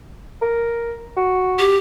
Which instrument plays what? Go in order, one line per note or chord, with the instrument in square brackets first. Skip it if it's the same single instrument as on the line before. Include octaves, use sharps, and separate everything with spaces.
[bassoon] A#4
F#4
[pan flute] G4